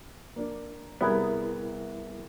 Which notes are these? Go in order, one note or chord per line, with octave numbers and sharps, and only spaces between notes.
A#3 D4
C2 G3 B3 E4 G#4 A#4 G#6